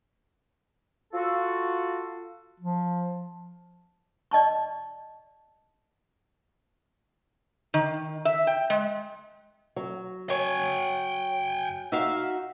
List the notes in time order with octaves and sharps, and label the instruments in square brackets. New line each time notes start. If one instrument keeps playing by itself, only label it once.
[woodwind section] F4 F#4 A4
[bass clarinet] F3
[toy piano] D5 D#5 A5 C#6
[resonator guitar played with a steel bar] D#3
E5
G5
G#3
[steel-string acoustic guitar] F#3
[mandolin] C#5 [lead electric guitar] G5 G#5
[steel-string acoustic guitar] D#4 F#4 [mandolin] E5 F5